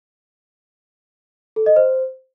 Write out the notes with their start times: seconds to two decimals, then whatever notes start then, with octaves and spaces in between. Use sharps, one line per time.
1.56 A4
1.66 D#5
1.76 C5